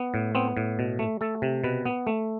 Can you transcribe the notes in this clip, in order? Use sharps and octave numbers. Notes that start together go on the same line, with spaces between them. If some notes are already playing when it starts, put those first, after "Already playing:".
Already playing: B3
A2
B3 C4
A2
B2
A3
A3 A4
C3
B2 B4
B3
A3